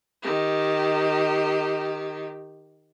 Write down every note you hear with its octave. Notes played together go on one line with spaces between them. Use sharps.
D#3 G4